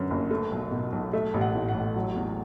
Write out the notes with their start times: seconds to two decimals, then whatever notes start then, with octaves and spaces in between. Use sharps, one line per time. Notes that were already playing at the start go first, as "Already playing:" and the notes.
Already playing: F#2 D3 B3
0.10 F#1
0.31 A3
0.51 B1
0.71 B2
0.92 B1
1.13 A3 E5
1.34 A1
1.41 F#5
1.55 A2
1.68 F#5
1.74 A1
1.96 F#3
2.16 E2